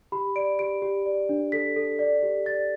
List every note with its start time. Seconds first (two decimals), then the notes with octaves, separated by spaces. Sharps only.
0.12 G4 B5
0.36 D5 D7
0.59 G4 D7
0.82 G4
1.06 D5
1.29 D4
1.52 A4 B6
1.76 A4
1.99 D5
2.23 G4
2.46 D5 A6